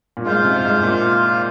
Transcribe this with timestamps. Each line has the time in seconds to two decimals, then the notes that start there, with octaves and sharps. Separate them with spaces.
0.17 A#2
0.25 G#2 F4 C5 F5
0.45 C3
0.64 G#2
0.83 A#2